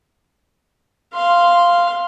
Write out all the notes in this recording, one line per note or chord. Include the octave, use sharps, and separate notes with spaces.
F5 C6